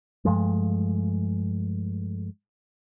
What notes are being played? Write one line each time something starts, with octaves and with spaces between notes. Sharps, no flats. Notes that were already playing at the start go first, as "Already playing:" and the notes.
G2 F3 G#3 A3